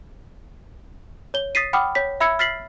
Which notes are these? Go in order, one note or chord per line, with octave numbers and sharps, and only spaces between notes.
C#5 G7
D#6 A6 B6 C7 D#7
F#5 G5 B5 D6 D#6 F6
C#5 B6
E5 B5 E6 G#6 C#7
F6 A6 B6 C7 F#7